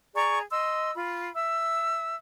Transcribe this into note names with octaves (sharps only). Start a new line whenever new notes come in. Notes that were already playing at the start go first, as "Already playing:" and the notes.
G#4 D5 A#5 C#6
D#5 C6 E6
F4 B5
E5 E6